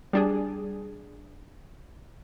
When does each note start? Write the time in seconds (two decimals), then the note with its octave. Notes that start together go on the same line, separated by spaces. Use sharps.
0.13 G3 D4 G#4